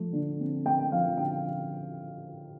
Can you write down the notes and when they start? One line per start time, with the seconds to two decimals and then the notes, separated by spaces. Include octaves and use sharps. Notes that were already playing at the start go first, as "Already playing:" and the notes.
Already playing: F3 A3
0.13 D3
0.40 C4
0.65 A3 G5
0.92 F3 F5
1.17 D3 G5